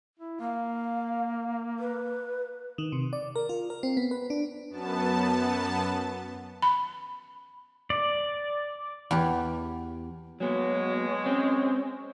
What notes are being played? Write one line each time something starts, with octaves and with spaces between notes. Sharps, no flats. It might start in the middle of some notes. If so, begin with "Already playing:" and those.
E4
A#3 F5
B4
D#3
C3
D5
A#4
F4
A#4
C4
B3
B4
D4
F#2 B3 A5
B5
D5
E2 G4
B2 F#3 G#3 A#3 B3 C#5
C4 C#4